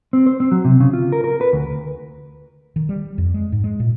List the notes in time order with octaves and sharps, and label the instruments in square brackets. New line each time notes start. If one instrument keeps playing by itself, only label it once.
[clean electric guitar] C4
C5
C4
F#3
C3
C#3
F4
A#4
A#4
B4
D2
[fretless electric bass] D#3
G3
F2
G#3
G#2
G#3
A#2